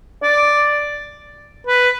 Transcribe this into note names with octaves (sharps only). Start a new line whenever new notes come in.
D5
B4